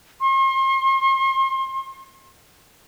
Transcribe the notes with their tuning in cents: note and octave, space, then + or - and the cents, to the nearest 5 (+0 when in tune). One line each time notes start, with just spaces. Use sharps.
C6 +40